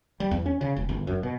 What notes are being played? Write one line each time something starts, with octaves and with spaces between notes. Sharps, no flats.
G3
E2
C#4
C#3
E1
G1
F#2
B2